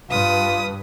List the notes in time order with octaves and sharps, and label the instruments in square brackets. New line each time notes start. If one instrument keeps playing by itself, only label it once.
[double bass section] G2 [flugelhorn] F4 [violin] B4 D#6